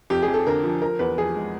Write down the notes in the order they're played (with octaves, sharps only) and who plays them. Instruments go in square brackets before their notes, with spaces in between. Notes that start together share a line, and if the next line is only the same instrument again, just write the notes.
[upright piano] F2 G4
G#4
F2
A4
D3 A#4
F3
F3 A#4
E2 B4
F3 G#4
G#3